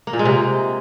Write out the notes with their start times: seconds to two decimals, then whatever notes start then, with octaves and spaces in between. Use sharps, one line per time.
0.07 A#3
0.13 A#2
0.19 G#3
0.25 C3